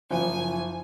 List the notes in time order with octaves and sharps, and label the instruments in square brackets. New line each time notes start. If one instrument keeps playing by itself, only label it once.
[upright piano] F#1 F3 [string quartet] G#5